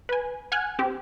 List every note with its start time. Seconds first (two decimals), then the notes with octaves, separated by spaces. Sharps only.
0.09 B4 G#5
0.52 F#5 G#5 F6 F#6 G#6
0.79 C4 G4